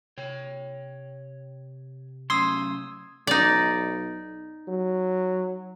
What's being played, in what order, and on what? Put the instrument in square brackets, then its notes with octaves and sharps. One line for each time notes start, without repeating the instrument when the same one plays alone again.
[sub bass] C3 [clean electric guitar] C#5 G5
[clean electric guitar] F#3 A3 C#4 [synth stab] C6 [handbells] D#6 E6 G#6
[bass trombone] B1 [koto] D#4 D5
[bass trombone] F#3